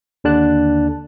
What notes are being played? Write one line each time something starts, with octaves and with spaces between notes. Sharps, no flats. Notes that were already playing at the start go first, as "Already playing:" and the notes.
D#2 D3 D4 A5 F#6